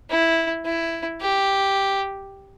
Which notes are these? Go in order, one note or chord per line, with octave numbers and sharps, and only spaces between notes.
E4
E4
G4